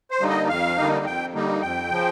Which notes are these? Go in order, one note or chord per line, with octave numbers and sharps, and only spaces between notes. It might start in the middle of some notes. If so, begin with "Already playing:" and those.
C5
D3 G3 A#3 D#4
D#5
F2 F5
D3 G3 A#3 D#4
F2 G5
D3 G3 A#3 D#4
F2 G5
C#3 F3